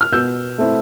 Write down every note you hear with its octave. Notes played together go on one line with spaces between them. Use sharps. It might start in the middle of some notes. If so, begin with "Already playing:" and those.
F6
B2 E6 G6
A3 C4 E4